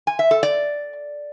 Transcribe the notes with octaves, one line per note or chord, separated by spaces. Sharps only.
G#5
E5
A4
D5